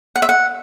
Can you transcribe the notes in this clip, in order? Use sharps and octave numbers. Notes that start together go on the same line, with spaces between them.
F#5
E5
F#5